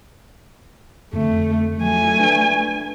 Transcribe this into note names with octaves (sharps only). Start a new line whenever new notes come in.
F2 D3 A3
F3 F#3 A3 G#5
D4 B4